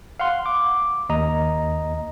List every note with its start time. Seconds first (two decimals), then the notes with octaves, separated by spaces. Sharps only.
0.20 F5 F#5 C6
0.46 D6
1.09 D#2 D#5 A#5